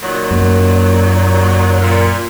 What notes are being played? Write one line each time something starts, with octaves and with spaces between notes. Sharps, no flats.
A#2 D#3 F#3
F#2 A#3
A#2